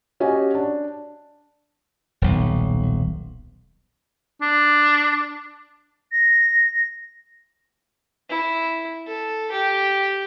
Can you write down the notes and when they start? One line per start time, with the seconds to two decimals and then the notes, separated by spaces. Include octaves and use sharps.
0.20 C#4 F#4 G4 D#5 G#5
0.54 D4
2.22 D#1 B1
4.42 D4
6.11 A#6
8.29 E4
9.07 A4
9.51 G4